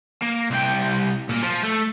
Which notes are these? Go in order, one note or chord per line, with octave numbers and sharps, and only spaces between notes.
A#3
C2 G5
A#2 A#3
F3 F4
A3